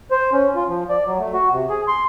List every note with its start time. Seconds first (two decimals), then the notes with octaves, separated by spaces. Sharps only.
0.11 C5
0.33 C#4
0.55 F4
0.68 F3
0.89 D5
1.06 F#3
1.19 A3
1.34 F#4
1.51 C3
1.69 G#4
1.88 C6